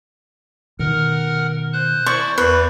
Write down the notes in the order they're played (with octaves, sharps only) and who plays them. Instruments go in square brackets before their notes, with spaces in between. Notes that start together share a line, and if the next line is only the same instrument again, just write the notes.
[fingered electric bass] B2 D#3 [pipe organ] A#4 F#5 F6
[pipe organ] C5 F#6
[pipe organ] E4 C5 D5 [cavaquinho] C#6
[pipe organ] E2 C#6 [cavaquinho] B4